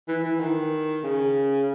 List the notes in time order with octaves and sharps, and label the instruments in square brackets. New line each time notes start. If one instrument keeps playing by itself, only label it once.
[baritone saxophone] E3
E3
D#3
C#3